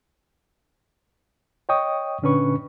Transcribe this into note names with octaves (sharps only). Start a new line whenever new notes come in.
C#5 D#5 G5 C#6 D#6
A#2 D3 C#4 D4 B4 C#6